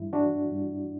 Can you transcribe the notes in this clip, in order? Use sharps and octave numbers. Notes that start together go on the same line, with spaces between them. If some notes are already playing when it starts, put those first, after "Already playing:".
Already playing: G2 E3 E4
E3 D4 F#4
G2